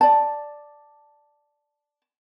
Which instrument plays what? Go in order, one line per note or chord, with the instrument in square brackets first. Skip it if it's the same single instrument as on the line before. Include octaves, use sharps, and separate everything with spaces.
[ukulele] D5 A5